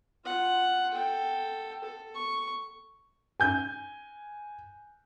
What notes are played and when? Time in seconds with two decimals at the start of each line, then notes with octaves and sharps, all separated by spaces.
0.25 F4 F#5
0.93 A4 G5
1.84 A4
2.14 C#6
3.40 G#5 G6